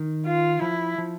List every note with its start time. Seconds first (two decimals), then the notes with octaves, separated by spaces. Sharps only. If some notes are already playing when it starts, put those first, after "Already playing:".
Already playing: D#3
0.26 F4
0.62 F3 E4
0.98 F3